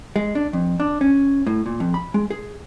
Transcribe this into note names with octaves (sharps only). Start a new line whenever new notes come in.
G#3
D4
F2
D4
C#4
A2
A#2
F2
B5
G#3
G#4